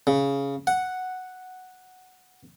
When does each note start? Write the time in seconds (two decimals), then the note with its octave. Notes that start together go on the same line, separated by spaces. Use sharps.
0.07 C#3
0.67 F#5